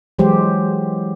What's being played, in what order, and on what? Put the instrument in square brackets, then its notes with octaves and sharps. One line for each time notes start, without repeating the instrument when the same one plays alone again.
[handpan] E3 F#3 G#3 G4 C5